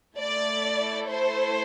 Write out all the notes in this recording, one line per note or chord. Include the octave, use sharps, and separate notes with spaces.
A3 E4 A4 D5
C5